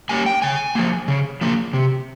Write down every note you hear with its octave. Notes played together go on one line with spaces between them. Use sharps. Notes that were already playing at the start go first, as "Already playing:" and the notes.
G3 A#3 C#4 G#5
G5
C#3 G#5
F3 A#3
C#3
F3 A#3
C3